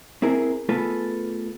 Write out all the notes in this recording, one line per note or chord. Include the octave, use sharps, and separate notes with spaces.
C4 E4 G#4 A#4
A3 B3 F4 G#4 A4 B4